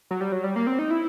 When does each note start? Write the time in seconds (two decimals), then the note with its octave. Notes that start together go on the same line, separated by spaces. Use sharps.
0.11 F#3
0.21 G3
0.32 F#3
0.44 G3
0.56 A#3
0.67 C4
0.79 D#4
0.90 E4